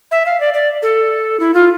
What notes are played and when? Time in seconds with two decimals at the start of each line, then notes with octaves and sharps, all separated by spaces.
0.11 E5
0.26 F5
0.40 D5
0.54 D5
0.82 A4
1.40 E4
1.54 F4